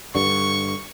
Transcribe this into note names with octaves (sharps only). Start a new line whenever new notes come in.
G2 D3 C#6